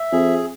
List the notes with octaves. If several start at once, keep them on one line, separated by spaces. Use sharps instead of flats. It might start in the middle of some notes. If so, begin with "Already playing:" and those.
Already playing: E5
F2 G#4